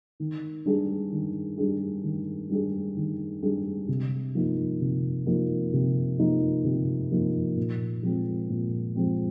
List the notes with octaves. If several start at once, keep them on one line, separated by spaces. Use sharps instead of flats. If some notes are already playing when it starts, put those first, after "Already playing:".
D#3
G3 D4 G#4
D#3
G3 D4 G#4
D#3
G3 D4 G#4
D#3
G3 D4 G#4
C3
F3 A#3 D#4
C3
F3 A#3 D#4
C3
F3 A#3 D#4
C3
F3 A#3 D#4
A#2
F3 G#3 C4
A#2
F3 G#3 C4